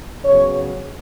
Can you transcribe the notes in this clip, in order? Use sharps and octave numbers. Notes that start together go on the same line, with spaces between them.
C#3 F#3 B3 C#5